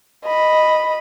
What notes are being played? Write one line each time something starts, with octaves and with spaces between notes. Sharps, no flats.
D#5 B5